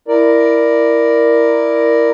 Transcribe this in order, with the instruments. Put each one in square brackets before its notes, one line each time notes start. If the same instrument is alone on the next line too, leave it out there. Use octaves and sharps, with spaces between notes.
[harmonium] E4 A#4 D5